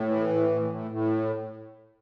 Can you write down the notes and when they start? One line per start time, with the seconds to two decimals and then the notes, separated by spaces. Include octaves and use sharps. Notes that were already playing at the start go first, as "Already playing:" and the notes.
Already playing: A2
0.09 E3
0.29 A2
0.49 A2
0.70 A2
0.91 A2